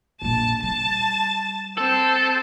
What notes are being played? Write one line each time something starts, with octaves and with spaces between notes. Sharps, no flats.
A#1 F2 A5
G3 A5
C4 A4 C5